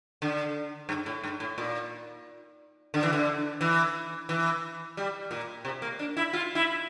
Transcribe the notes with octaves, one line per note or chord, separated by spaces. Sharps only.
D3
G2
A2
G2
A2
A#2
D3
E3
D3
E3
E3
G3
A#2
C3
A#3
D4
E4
F4
E4